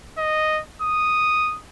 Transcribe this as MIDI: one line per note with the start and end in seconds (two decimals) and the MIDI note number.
0.18 0.61 75
0.82 1.58 87